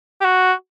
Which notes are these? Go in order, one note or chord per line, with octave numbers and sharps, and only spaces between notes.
G4
F#4